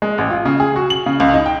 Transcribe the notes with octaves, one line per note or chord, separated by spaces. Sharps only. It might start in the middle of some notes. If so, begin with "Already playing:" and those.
G#3
A1
F4
C#3
G#4
F#4
F#7
C#3
C#2
D#4
G5